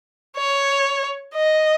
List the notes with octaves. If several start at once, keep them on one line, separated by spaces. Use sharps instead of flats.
C#5
D#5